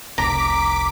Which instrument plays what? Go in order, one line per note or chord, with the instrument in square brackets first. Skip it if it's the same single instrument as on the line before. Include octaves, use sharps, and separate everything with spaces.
[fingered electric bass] F1 C2 [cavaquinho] A#5 [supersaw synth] D6 B6 D7